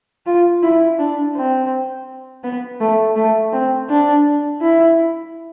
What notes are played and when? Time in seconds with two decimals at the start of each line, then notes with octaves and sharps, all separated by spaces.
0.26 F4
0.63 E4
0.99 D4
1.35 C4
2.44 B3
2.81 A3
3.16 A3
3.53 C4
3.89 D4
4.61 E4